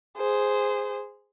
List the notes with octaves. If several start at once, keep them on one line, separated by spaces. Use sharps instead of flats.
G#4 C5